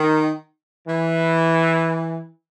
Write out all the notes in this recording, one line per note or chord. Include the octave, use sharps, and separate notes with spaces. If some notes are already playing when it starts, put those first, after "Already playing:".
Already playing: D#3
E3